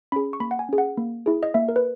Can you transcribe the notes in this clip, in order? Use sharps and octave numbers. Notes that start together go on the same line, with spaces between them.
C#4 G#4 B5
C#6
A#3 B5
F#5
G#5
C#4 G#4
F#5
A#3
E4 G#4
D#5
A#3 E5
A#4
B4